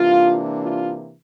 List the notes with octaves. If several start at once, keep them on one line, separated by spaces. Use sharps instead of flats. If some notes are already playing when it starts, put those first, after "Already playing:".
Already playing: C3 E3 A#3 D4 F4
F4